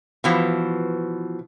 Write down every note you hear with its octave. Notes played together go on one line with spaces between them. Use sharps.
B2 E3 F3